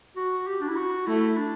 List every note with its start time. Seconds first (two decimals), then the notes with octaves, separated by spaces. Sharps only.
0.17 F#4
0.47 G4
0.61 D4
0.68 E4
0.76 F#4
1.06 A3 E4
1.37 D4